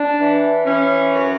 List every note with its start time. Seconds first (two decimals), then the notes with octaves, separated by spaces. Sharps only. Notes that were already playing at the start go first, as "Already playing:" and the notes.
Already playing: D4
0.19 E3
0.65 E3 C#4
1.11 F#2